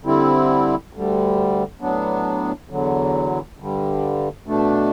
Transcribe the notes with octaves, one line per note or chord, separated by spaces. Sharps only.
D3 G3 C4 E4
D2 D3 G3
A2 F#3 B3 D4
E2 D3 F#3
G2 D3 G3
B2 A3 D4